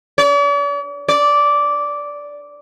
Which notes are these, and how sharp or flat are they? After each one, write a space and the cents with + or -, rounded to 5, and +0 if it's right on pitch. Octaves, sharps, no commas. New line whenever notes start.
D5 -45
D5 -10